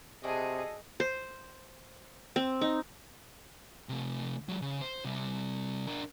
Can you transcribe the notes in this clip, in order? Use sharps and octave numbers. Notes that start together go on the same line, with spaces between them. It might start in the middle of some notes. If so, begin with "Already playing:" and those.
C3 D4 F#4 G#4 A4 D#5
C5
C4
D#4
C3 A3
F#3 G#3
C#3
C5
C3 G3
D4 A#4